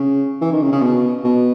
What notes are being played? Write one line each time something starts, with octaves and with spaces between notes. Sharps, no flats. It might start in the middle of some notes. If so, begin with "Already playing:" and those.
Already playing: C#3
E3
D#3
C#3
C#3
B2
B2